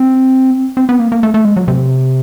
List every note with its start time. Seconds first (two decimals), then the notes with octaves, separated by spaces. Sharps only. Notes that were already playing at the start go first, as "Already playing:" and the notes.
Already playing: C4
0.77 C4
0.89 B3
1.00 A#3
1.12 A#3
1.23 A3
1.34 A3
1.45 G#3
1.56 F#3
1.68 C3